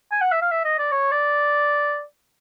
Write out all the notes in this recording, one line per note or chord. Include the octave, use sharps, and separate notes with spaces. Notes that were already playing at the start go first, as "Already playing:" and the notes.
G#5
F#5
E5
F5
E5
D#5
D5
C#5
D5